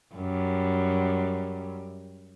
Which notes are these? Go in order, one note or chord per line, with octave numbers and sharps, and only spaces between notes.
F#2 G3